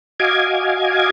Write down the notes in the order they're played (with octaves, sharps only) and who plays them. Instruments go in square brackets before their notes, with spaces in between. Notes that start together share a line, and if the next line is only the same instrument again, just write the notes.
[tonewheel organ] F#4 D#5 F5 G#5 D6 G#6